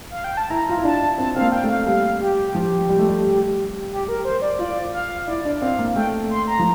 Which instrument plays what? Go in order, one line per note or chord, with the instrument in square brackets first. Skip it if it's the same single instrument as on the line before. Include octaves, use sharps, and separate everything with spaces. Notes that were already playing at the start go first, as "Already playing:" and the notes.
[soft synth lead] F5
G5
A5
[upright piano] E4 [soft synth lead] A#5
[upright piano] F4
E4
[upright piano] D4 [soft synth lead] A5
[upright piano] C4 [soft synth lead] A5
[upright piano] C4 [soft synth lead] F5
[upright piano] A#3
[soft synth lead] G5
[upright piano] A3
[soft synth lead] F5
[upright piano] G3 [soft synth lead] F5
[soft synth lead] G4
[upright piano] F3
G3
A3
G3
[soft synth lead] G4
A#4
C5
D5
[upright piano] F4 [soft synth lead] D5
[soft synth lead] F5
[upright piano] E4 [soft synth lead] D5
[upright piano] D4
[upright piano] C4 [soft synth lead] F5
[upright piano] A#3
[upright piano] A3 [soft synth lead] G5
[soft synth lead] C6
A#5
[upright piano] F3